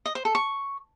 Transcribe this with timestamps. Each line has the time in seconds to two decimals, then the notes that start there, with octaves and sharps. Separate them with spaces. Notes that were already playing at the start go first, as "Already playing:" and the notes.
0.06 D#5
0.15 C5
0.25 A4
0.35 C#6